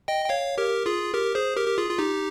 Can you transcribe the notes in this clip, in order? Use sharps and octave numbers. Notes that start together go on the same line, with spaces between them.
D#5 G5
G5
C#5 F5
G4 A#4
F4 G#4
G4 A#4
G#4 C5
G4 A#4
G4
F4 G#4
F4
D#4 G4